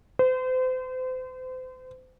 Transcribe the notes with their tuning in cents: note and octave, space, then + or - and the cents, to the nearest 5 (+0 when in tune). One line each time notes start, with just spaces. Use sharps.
C5 -35